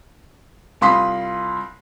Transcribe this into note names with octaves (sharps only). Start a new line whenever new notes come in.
C2 F4 B5 C6 D#6 B6